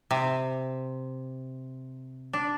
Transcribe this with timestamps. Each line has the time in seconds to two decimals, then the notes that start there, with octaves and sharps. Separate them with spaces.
0.11 C3
2.33 D4